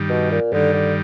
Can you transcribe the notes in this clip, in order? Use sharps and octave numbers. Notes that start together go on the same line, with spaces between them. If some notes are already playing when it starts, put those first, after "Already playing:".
Already playing: G2 D#3 G3
B2
A#2
G2 D3 D#3 G3
D3